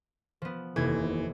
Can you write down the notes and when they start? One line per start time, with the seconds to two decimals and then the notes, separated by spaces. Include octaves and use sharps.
0.42 F3 B3
0.76 F1 D#2 E3 G#6